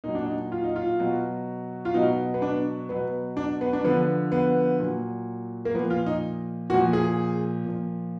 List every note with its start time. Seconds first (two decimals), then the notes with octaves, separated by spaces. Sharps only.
0.04 A#2 F#3 D#4
0.15 D4
0.25 D#4
0.52 F4
0.64 D#4
0.76 F4
1.00 B2 F#3
1.85 F4
1.94 B2 F#3 D#4
2.34 B3
2.42 D4
2.89 B2 F#3 B3
3.37 D4
3.61 B3
3.73 D4
3.84 D3 F3 B3
4.32 B3
4.80 A#2 F#3
5.65 A#3
5.75 A#2 F3 B3
5.90 F4
6.06 D#4
6.70 A#2 F#4
6.74 F3
6.93 G#4
7.65 A#2 F3